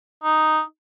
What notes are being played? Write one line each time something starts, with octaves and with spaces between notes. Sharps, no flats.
D#4